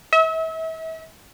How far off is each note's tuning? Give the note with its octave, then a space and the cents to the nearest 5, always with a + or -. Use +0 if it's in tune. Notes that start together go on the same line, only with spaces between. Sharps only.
E5 -40